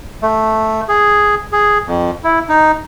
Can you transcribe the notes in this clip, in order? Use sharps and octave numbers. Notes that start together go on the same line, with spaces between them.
A3
G#4
G#4
F2
E4
D#4